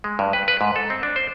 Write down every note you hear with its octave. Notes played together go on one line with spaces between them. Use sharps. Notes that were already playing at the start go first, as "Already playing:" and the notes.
G#3
G2
B4
B4
G#2
A4
C4
D4
C5